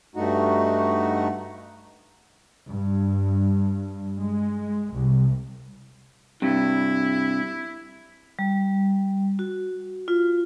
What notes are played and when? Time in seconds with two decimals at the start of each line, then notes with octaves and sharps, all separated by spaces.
0.16 G2 A3 D#4 F#4
2.70 G2
4.20 G#3
4.94 C2
6.42 G2 C3 E4
8.39 G3
9.39 F#4
10.08 F4